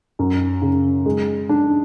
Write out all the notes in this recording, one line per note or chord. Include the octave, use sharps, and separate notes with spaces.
F#2
C#3
G#3
D4